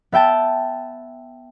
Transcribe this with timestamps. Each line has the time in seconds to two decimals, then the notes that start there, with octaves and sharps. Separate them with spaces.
0.12 B3 E5 G5 A5